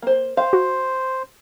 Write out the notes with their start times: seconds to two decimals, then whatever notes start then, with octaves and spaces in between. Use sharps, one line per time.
0.02 A#3 C5
0.37 C5 F5
0.53 F#4